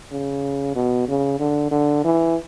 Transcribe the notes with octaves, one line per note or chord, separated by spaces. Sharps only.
C#3
B2
C#3
D3
D3
E3